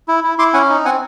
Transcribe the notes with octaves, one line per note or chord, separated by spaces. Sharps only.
E4
E4
E4 C6 D6
C#4 F#5 G#5
D#4
C4 F#5 G#5